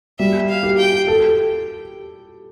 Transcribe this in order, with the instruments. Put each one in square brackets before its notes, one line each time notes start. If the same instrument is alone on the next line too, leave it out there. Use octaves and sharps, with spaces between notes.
[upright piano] G3 [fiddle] E5
[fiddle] F5
[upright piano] G4
[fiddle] G5
[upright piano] A4